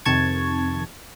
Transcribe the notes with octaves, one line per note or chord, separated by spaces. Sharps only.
F2 C3 D#3 A5 C#6 G#6